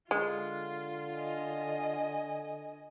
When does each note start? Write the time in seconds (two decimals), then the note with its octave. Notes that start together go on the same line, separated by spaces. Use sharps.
0.11 D3 G#3 F4
1.16 D#5 G#5